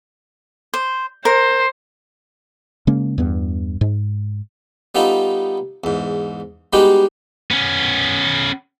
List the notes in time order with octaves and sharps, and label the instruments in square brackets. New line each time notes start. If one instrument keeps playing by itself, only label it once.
[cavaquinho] C5
[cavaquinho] A#4 [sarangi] C5
[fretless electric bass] C#3 G#3 A#3 C#4
E2 G2 B3
G#2
[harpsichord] G3 B3 D#4 F4 A4
E2 G#2
G3 G#3 B3 D#4 F#4 G4
[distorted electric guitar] B3 C#4